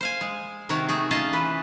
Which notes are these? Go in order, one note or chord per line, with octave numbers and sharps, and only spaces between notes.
C5 F5 G#5
G#3
C3 D#3 C4 F#4 A#4 C#5
A3 D#4 F#4 G#4
C#4 F4 G#4 D#5 F5 A5
E3 B4